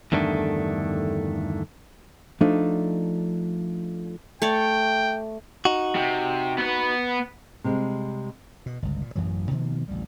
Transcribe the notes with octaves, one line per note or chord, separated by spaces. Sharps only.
E2 G2 D3 D#3 A3
F3 A3 D4 D#4
A3 C#5 D5 G5
D#4 F#4
C3
B3 B4
C3 G3 G#3
B2
G1 C#2
A#2
A1 F#2 E3 F#3
B2 D#3 F3 A#3
A1 D2 G3